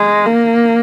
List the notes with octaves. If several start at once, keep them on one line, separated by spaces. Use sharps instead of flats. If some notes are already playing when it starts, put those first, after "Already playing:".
Already playing: G#3
A#3